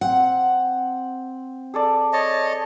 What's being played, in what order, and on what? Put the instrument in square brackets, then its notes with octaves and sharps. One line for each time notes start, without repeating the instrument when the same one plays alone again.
[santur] C4 [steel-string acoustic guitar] F#5
[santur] G#4 A4 D5
[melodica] C#5 D#5 A5